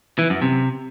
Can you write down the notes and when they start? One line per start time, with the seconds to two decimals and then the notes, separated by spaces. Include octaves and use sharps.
0.19 E3
0.30 F#2
0.42 C3